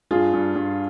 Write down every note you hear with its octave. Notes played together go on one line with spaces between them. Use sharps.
G2 F4 G#4
G2
G2